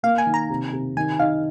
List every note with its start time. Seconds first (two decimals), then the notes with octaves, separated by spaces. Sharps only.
0.03 A#3 F5
0.18 G#5
0.27 D#3
0.34 A#5
0.50 C3
0.73 C3
0.97 D#3 G#5
1.19 D#4 F5